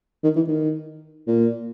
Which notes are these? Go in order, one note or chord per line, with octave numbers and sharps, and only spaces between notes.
D#3
E3
D#3
A#2